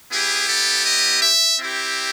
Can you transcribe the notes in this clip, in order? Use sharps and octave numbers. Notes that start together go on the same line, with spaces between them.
B3 E4 G4 G#4
A4
D#5
E5
C4 E4 G4